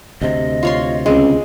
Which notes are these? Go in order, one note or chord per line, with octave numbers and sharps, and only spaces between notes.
D2 C3 D#5
F4 C#5 C6
C#2 C#3 G#3 C4